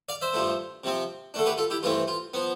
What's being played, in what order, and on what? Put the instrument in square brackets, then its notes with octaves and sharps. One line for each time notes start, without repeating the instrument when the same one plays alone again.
[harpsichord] D5 F5
C5 E5
G2 F3 A3
C3 F3 C4
D3 A3 D4 A4
G4 B4
F4 A4
E4 G4
G2 E3 A3 C4 F4
F4
F3 B3